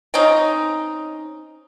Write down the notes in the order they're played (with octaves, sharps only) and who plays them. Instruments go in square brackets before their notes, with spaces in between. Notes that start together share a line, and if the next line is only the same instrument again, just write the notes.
[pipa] C4 C#4 D#4